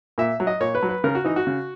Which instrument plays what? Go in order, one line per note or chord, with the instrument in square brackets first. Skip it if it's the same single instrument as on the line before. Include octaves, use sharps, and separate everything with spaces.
[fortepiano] A#2 E5
F#3
D#5
A#2 C#5
B4
F#3
B4
C#3 A#4
F#4
E3 D#4
F#4
C#3